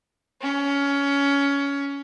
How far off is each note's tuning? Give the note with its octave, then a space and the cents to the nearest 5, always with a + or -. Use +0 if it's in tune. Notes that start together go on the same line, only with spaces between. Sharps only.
C#4 +20